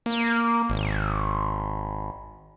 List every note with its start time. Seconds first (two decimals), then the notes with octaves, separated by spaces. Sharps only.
0.06 A#3
0.70 G#1